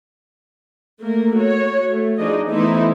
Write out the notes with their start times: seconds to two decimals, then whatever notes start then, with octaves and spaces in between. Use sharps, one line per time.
1.01 A3 A#3 A#4
1.36 F#4 C#5
1.88 A3
2.19 F3 D4 D#4 G#4 D#5
2.50 E3 A3 B3 D#4 E4 C5